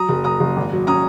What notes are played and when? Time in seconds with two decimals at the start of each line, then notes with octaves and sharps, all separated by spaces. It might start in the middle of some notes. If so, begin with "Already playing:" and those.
Already playing: F#3 A#5 D#6
0.09 F#1
0.24 F#3 A#5 D#6
0.40 F#1
0.56 G#1
0.72 F#3
0.87 C#4 A#5 D#6